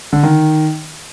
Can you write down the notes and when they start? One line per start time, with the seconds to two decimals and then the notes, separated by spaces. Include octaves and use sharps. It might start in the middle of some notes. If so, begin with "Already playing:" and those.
0.13 D3
0.23 D#3